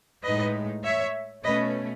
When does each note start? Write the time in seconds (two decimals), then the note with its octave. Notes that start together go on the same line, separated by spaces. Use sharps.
0.23 A2 G#3 D#4 B4 D#5
0.83 C#5 E5
1.43 B2 A3 C#4 B4 D#5